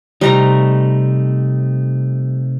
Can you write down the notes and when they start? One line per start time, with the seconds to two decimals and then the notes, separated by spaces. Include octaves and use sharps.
0.21 C3 G3 A3 D#4 A#5 C#6